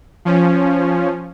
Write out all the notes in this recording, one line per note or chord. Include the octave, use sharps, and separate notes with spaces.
F3 C#4